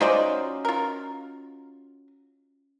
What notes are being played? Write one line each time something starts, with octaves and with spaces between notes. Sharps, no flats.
C#4 D#4 F4 F#4 C5 D5
F4 A#4